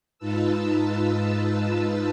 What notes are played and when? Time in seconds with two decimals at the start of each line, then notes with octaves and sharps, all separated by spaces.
0.19 G#2 D#4 F4 B4 A5 E6